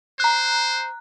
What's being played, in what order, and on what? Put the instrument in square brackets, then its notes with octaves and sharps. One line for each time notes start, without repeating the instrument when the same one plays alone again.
[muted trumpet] C5 [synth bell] A#5 F#6